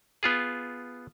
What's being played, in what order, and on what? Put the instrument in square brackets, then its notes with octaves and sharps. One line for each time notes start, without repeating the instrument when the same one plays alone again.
[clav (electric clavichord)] B3 F4 G#4